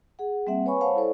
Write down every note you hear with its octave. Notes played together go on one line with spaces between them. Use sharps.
G#4 F#5
G3 A#3 C4 E5 F#5
B4 C#5 G#5 B5 C#6
C5 C#5 F5 F#5 A5 B5
E4 A4 C5 D5